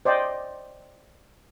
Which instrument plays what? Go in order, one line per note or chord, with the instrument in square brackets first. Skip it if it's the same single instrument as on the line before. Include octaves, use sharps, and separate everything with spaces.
[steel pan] C5 D5 D#5 G5